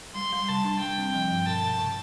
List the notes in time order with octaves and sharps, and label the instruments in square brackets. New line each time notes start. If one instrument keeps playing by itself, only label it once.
[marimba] G3 [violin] C6
[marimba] G3
[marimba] C3 [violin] A5
[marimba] D4
[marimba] G3 [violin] G5
[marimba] C4
F3
G2
[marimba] B2 [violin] A5
[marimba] B2
C3